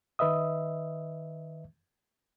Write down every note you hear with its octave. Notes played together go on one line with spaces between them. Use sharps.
D#3 B4 D#5 E5 D#6